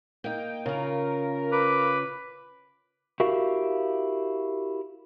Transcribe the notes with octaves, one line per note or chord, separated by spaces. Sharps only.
A#3 D#4 G5
C#3 F4 A#4
B4 D6
E4 F#4 G4 A#4 F5